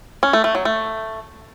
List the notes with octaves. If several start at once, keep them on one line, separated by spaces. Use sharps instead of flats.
C#4
A3
A3
F#3
A3